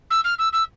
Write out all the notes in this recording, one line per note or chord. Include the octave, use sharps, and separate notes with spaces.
E6
F6
E6
E6